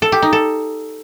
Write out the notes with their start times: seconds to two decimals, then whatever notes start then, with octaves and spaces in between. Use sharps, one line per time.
0.02 A4
0.12 G4
0.22 D#4
0.33 A4